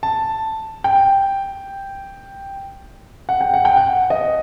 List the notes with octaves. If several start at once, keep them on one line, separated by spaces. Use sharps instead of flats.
A5
G5
F#5
G5
F#5
G5
F#5
D#5